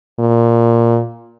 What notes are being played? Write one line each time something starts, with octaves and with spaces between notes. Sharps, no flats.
A#2